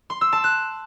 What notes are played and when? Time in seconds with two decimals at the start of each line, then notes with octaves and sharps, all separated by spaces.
0.10 C6
0.21 E6
0.33 A5
0.44 F#6